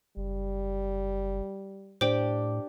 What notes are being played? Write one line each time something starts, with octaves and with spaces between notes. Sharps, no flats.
F#1 G3
A2 D4 G4 C5 G5 D6